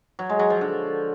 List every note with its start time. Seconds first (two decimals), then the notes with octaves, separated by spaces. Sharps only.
0.19 F#3
0.29 G#3
0.39 F#3
0.50 F3
0.61 D3